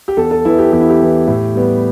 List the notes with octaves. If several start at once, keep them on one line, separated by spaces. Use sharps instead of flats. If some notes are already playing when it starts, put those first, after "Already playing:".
G4
E2 A4
A4
E3 B3 E4
G4
E2 G4
E4
G4
E3 B3
A2
G3 B3